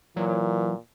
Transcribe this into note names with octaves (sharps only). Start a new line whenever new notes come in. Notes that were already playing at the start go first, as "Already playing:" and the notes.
A#2 E3 F#3